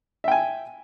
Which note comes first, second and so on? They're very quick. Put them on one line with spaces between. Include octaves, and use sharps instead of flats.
E5 G5 G#5